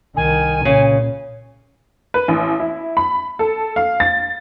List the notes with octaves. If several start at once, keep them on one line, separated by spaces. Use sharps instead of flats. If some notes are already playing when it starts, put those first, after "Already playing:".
C2 D#3 G#5
A#2 C#3
B4
A1
E4
B5
A4
F5
A6